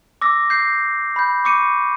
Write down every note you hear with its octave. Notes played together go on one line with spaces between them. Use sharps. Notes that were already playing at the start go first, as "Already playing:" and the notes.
D6 E6 A#6
G6 C7
B5 G6
C#6 D6 C#7 D#7